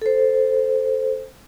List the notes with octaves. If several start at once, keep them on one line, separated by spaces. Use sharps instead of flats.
A4 C5